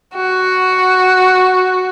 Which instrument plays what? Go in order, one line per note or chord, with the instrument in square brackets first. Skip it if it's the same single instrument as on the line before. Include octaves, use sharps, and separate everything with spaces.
[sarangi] F#4